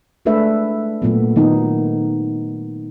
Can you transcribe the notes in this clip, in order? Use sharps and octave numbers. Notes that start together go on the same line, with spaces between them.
G#3 A3 D4 A4 B4 E5
A#2 F#3 A3 B3
D#3 F#3 B3 D#4